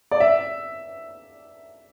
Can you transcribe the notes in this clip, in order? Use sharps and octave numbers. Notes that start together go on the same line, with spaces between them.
D5
E5